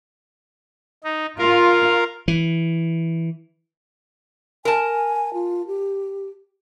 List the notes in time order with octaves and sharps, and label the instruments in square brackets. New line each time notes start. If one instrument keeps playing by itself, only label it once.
[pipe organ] D#4
[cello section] F4 [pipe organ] A#4 F5
[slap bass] E3
[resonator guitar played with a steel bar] A#4 A5 [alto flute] G#5
[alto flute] F4
G4